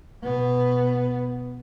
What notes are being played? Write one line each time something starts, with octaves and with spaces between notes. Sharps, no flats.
B2 B3